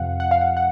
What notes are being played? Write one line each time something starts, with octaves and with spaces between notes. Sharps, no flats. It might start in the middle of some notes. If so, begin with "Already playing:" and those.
Already playing: F2 C3 F3 F5 F#5
F#5
F5
F#5
F#5